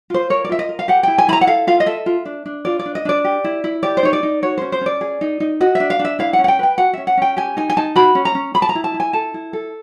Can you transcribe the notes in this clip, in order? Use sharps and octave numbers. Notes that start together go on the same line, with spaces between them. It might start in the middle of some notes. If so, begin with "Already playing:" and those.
F4 C5
A#4 C#5
D5
F4 E5
D#5
A#4
F5
G4 F#5
E4 G5
G#5
E4 A#5 B5
F#5
A4 F5
F4 F5
D#5
A4 E5
F4
D4
D4
F4 D5
D5
D4
D#5
D4 D5
G4
E4
E4
G4 D5
C5
D#4 C#5
D5
D#4
F#4 C#5
C#4 C5
C5
C#4 D5
G#4
D#4
D#4
F#4 D#5
D4 E5
F5
D4
E5
E4 F5
F#5
C#4
F#5
G5
B4 G5
F#4 F#5
C#4 E5
F#5
C#4 G5
G4 G#5
D#4 G#5
G#5
D#4 A5
F#4 B5
C#4
A#5
C#4
G#4 B5
A5
A#5
E4
A5
E4
G#5
A4 A5
E4
A4